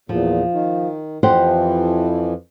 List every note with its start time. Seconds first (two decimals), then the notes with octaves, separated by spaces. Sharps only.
0.09 E2 A#2 F3
0.53 D#3
1.23 F2 E3 F3 G4 C5 F#5